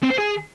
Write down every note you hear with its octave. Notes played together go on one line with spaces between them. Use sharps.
C4
C5
G#4